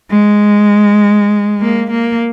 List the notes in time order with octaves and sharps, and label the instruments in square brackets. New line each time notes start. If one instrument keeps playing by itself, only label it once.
[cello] G#3
A#3
A#3